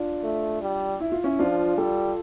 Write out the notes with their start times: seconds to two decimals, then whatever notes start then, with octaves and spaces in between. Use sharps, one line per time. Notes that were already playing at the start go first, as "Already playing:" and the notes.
Already playing: D4 F4
0.23 A3
0.62 G3
1.00 E4
1.12 F4
1.24 C#4 E4
1.39 F3 D4 F4
1.77 G3 F4 A4